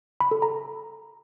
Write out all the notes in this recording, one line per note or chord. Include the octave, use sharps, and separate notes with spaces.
B5
A4
A#5